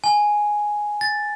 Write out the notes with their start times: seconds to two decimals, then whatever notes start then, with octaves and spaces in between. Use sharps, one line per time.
0.04 G#5
1.01 A6